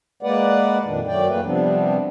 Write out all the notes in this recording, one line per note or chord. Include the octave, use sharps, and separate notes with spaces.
G#3 A#3 B4 D5 F#5
F2 A#2 D#3 D4
F#2 F#3 A3 D5 G5
E3 A3 A#3 B4
C3 F3 G3 B3 C4 D4